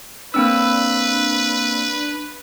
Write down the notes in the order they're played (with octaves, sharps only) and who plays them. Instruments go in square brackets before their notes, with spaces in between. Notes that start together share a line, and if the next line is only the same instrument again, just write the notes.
[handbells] A#3 C4 E6 [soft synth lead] D4 [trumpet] B4